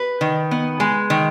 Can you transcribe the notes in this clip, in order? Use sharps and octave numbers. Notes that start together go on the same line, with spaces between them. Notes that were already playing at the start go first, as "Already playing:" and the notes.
Already playing: B4
D#3
B3
G#3
D#3